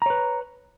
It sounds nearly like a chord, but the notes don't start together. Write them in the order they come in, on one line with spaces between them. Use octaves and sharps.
A#5 C#5 B4